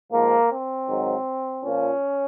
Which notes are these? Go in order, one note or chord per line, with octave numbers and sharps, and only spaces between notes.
G#2 F3 A#3
C4
G#2 D#3 F#3
A#2 F3 C#4